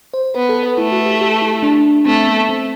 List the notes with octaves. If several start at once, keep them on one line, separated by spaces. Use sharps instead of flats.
C5
B3 B4
A4
B4
A3 E4
F#4
G4
G4
E4
D4
A3 C4
B3
C4